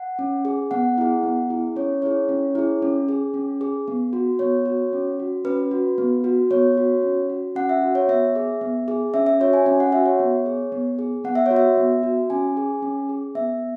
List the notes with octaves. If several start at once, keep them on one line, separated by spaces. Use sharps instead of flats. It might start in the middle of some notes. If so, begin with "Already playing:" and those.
Already playing: F#5
C#4
G#4
B3 F#5
E4 G#4
B3
E4 G#4
C#4 C#5
E4 G#4 C#5
C#4
E4 G#4
C#4
G#4
C#4
G#4
B3
F#4
B3 C#5
F#4
C#4
F#4
C#4 B4
F#4
B3
F#4
B3 C#5
F#4
C#4
F#4
C#4 F#5
E5
F#4
C#5
B3 E5
G#4
B3
G#4
C#4 E5
E5
F#4 C#5
G#5
C#4 G#5
F#5
F#4 E5
C#5
B3
G#4
B3
G#4
B3 F#5
E5
F#4 C#5
E5
B3
F#4
C#4 G#5
G#4
C#4
G#4
B3 E5